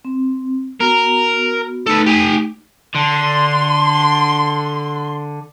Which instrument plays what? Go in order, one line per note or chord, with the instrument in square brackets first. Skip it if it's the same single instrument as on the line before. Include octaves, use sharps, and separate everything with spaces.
[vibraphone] C4
[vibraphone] B3 F#4 [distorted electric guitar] A#4
[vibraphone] A3 D#4 [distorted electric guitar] B3 A4
[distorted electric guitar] G4 G#5
[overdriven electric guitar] D3 [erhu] C6